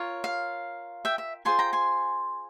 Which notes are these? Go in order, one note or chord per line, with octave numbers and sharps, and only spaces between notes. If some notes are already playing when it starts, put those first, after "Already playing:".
Already playing: F4 A#4 C#5
F5
E5 G5
E5
F4 G#4 C5 G#5 C6
G5 A#5
G#5 C6